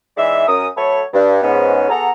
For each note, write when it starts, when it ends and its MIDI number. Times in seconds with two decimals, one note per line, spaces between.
0.17 0.45 52
0.17 0.45 56
0.17 0.45 63
0.17 0.45 74
0.17 0.45 76
0.47 0.67 42
0.47 0.67 61
0.47 0.67 70
0.47 0.67 87
0.77 1.02 54
0.77 1.02 57
0.77 1.02 69
0.77 1.02 71
0.77 1.02 73
1.13 1.41 43
1.42 1.86 44
1.42 1.86 59
1.42 1.86 61
1.89 2.11 59
1.89 2.11 66
1.89 2.11 68
1.89 2.11 69
1.89 2.11 78
1.89 2.11 82